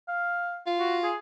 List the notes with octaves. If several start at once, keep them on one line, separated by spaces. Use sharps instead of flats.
F5
F4
F#4
G#4